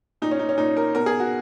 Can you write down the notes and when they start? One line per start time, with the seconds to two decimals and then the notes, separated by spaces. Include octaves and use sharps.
0.22 A#2 D#4
0.31 C#4
0.39 D#4
0.49 C#4
0.58 A#2 D#4
0.77 A#4
0.95 B2 A#4
1.06 G#4
1.20 F#4